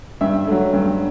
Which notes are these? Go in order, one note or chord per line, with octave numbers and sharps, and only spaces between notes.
G2 E5
F#3 A3
G2